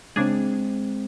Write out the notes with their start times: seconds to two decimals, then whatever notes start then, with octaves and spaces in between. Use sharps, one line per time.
0.16 C#3 G#3 C4 D4 G#4